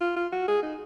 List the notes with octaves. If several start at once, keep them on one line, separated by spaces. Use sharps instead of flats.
F4
F4
F#4
G#4
D#4